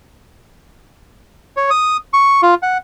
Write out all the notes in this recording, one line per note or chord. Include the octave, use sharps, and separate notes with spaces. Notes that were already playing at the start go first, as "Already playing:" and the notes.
C#5
D#6
C#6
F4
F#5